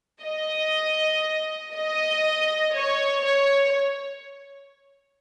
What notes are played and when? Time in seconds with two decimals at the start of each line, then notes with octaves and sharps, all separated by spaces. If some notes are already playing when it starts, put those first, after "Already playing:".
0.23 D#5
1.74 D#5
2.75 C#5
3.25 C#5